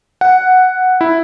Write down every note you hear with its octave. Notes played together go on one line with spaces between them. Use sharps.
F#5
E4